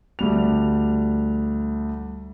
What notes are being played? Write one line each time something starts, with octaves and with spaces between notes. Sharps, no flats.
D2 G3 F7